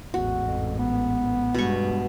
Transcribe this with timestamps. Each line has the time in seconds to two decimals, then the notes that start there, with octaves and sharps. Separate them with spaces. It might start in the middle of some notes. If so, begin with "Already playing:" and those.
0.14 A1 E2 G#2 F#4
0.46 F2
0.79 B3
1.55 G2 B2 G#3 C#6